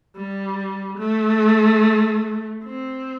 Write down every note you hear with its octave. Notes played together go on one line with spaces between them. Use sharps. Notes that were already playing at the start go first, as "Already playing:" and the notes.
G3
A3
C4